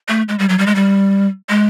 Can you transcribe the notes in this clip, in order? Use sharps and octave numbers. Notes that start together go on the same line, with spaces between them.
A3
G#3
G3
F#3
G3
G#3
G3
G#3